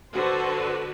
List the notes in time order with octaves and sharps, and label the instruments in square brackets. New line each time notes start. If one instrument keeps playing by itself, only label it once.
[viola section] D3 F#4 B4 [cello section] A4 C5